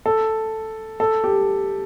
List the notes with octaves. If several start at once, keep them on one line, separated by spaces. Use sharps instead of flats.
A4
A4
G4